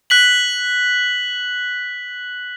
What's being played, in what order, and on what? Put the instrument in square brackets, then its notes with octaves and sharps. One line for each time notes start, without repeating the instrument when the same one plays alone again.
[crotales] F#6 B6 F#7